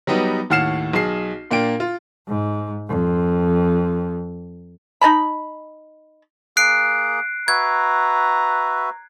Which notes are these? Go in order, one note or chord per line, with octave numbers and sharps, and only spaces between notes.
F#3 G3 B3 D#4 B4
D#2 A2 F#5 F6 C7 E7
B1 G#4 C7
A#2 A#3 D4 G5 D7
F4
G#2
F2
D#4 D#5 A5 B5
A#3 G#4 F#6 C7 D7
F#4 B4 E5 A#5 G#6